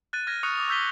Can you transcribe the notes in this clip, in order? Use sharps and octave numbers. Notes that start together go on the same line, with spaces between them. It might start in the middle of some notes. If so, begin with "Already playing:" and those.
F#6 A6 D#7
F6 G#6 A#6
C#6 D#6 F#6 C#7 F7
D6 D#6 F7
C#6 E6 G6 B6 G7